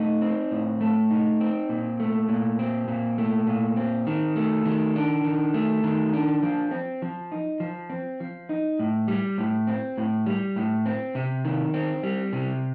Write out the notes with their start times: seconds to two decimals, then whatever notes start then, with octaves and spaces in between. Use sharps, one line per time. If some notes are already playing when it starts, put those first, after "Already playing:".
Already playing: A3 D#4
0.22 C4
0.52 A2
0.81 A3
1.10 D#4
1.40 C4
1.69 A#2
2.00 A3
2.29 A#2
2.59 C4
2.88 A#2
3.18 A3
3.47 A#2
3.76 C4
4.07 D#3
4.36 A3
4.65 D#3
4.95 D4
5.24 D#3
5.54 A3
5.84 D#3
6.14 D4
6.43 F3
6.71 C4
7.02 F3
7.32 D#4
7.60 F3
7.90 C4
8.20 F3
8.49 D#4
8.79 A2
9.08 G3
9.38 A2
9.67 C4
9.98 A2
10.26 G3
10.56 A2
10.86 C4
11.15 C3
11.45 D#3
11.74 C4
12.03 G3
12.33 C3